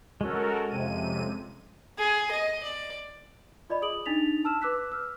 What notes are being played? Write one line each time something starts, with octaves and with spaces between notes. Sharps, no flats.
G#3 C#4 F#4 A4 A#4
F2 C3 D#7
G#4
D#5
D5
F4 D5 D#5 B5
G#4 D#6 D7 F#7
D4 D#4 A6 B6 F7
A5 E6 F6 E7
B4 D6 E6 F#6 B6
E6 F6